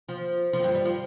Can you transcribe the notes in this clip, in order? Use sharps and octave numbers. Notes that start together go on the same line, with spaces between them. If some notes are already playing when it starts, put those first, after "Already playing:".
F3
F3
F2
G2
G3
F3